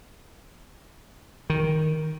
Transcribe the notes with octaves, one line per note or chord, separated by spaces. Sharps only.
D#3